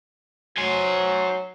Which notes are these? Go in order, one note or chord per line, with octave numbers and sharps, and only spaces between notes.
F#3 C5 G#5